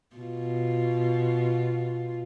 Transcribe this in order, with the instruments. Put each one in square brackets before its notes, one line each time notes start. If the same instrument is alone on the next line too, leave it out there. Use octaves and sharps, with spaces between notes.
[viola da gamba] B2 F4